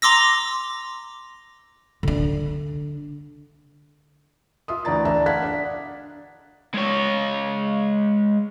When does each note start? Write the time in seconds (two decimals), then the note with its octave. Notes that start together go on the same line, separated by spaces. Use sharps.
0.02 A#5 C6 D6 E6 A#6
2.03 D3 D4
4.68 F4 E5 C6 D#6
4.85 D2 E3 D5 A#5 A6
5.05 D4 D5 E5 A5 A#5
5.26 F5 F#5 F#6 G#6 B6
5.43 D4 F#5
6.74 G#3 C#5